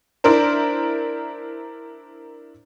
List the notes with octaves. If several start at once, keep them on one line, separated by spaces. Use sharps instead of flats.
D4 E4 A#4 C5